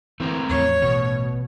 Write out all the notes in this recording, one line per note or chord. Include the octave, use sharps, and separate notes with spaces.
D3 E3 A3 C4 A#4
E2 A2 F3 C#5
A1 B2